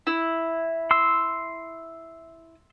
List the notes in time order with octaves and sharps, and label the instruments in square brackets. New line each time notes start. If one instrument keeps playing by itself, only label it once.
[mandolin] E4
[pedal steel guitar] C6 E6